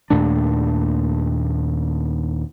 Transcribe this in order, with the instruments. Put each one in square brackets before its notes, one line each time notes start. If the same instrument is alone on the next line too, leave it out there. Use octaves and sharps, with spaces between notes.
[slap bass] D#2 A#2 A3 D4